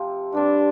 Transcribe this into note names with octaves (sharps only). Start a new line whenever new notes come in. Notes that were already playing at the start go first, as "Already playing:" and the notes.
Already playing: C3 F3 C4 F4
G2 G3 C4 D4